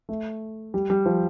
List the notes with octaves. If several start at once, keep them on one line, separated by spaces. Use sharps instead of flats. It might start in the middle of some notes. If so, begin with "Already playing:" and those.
A3
G3
G3
F3